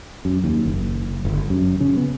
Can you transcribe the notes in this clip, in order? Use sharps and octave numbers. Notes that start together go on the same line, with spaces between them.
F#2
D#2
F#1
G1
F#2
C#3
B3